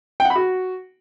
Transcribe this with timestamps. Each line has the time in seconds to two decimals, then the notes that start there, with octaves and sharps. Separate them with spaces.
0.20 G5
0.25 F#5
0.30 B5
0.35 F#4